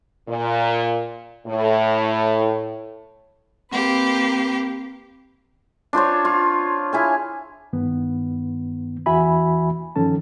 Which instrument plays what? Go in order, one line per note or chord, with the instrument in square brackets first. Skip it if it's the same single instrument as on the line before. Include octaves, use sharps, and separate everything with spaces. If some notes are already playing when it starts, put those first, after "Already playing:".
[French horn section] A#2
A2
[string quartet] A#3 G4 B4 [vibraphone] C4
[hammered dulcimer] D4 F4 C5 C#5
F4
E4 G#4 F5
[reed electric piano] G2 D#3 B3
E2 E3 F#4 E5 G#5 B5
G2 D#3 F3 C#4 A4 A5